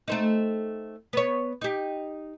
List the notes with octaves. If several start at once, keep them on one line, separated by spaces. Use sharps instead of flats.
A3 C4 D#4
B3 C#5
D#4 G4